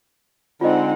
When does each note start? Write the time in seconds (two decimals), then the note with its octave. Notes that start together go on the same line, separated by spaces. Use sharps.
0.61 D3 G#3 C4 D#4 F4 D#5 F#5